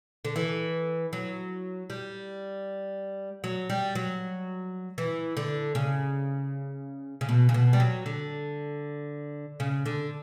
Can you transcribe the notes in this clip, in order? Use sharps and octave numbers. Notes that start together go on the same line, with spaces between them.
D3
E3
F#3
G3
F#3
G3
F#3
E3
D3
C#3
C#3
B2
C#3
B2
G3
F#3
D3
C#3
D3